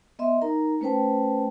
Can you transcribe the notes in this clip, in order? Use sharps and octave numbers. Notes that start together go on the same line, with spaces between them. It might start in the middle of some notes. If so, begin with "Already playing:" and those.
B3 D#5 E5 C6
D#4 A#4 A#5
A3 C#4 B4 C5 G5 A5